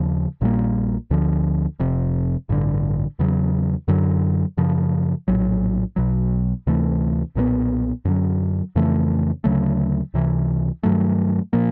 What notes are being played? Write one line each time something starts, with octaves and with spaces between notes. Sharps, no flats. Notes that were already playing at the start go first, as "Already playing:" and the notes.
Already playing: D#2 C#3 F3
A#1 A#2 G3 A#3
D2 D3 F3
F1 F2 C3
A1 G2 D3
E2 C#3 F#3
F#2 D3 F#3
F#2 C#3 F3
A#1 A2 F#3
B1 B2 F#3
D2 C3 E3 A3
B1 A#2 G3 B3
F#2 D3 F#3
F2 C#3 E3 A3
D2 C#3 F#3 A3
C#2 C3 E3
G2 D#3 F#3 A3
A#2 F3 A#3